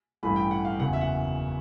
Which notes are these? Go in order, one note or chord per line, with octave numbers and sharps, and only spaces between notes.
A1 G2 E3 A3 B5
G5
F#5
F5
F#1 E2 C#3 F#5
E5
F#5